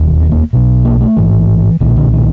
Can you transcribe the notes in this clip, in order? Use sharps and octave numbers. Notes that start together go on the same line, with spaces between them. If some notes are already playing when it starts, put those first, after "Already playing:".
Already playing: E1 D#2
C4
A#3
B1 B2
A#3
A3
A1 G#2 E3
B1 A#2 D#3
D3
D#3